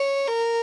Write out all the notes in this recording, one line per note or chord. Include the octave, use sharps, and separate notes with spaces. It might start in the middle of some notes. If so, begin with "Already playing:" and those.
Already playing: C#5
A#4